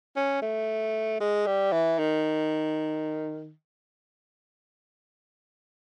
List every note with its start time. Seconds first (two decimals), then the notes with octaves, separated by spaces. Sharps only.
0.16 C#4
0.42 A3
1.20 G#3
1.46 G3
1.72 E3
1.99 D#3